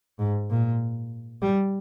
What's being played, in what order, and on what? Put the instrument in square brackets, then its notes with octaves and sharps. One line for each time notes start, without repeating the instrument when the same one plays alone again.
[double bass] G#2
A#2
G3